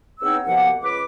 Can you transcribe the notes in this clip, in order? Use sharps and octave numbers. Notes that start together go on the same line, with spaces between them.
E2 B3 C4 D#4 C#5 E6
C2 B2 F3 A#3 G4 F#5
C#2 B4 D6